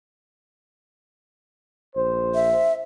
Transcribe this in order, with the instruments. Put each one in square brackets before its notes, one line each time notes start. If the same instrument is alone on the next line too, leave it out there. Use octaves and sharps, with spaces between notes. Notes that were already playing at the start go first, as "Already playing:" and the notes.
[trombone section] A#1 C5
[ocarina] E5